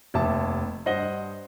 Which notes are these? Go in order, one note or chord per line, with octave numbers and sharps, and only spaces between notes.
F1 D#2 E5 A5 D6
G2 C5 D#5 F#5 A#6 G7